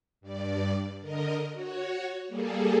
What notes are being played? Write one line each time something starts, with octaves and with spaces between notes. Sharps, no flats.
G2 D5
D3 A#4 D#5
F#4 C#5
G3 A#3 G#4 A4